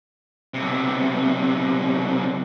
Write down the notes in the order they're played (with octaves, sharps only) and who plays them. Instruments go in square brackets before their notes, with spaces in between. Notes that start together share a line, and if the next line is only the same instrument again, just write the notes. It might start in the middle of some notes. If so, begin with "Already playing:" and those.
[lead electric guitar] B1 C3